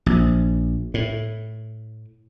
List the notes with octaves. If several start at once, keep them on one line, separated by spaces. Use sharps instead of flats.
A#1
A2